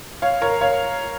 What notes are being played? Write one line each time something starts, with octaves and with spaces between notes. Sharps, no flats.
C#5 F5
A#4 C#5
C#5 F5